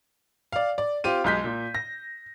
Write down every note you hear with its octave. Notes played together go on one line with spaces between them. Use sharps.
D5 F5
D5
C4 F4 G4 D#7
B1 G#3 G6 B6
A#2
A#6